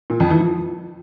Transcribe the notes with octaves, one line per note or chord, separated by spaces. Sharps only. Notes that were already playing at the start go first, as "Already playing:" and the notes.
A#2
F2
E3
F3